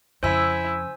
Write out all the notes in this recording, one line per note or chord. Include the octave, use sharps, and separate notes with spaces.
F2 C#3 E4 C5 G#5 E6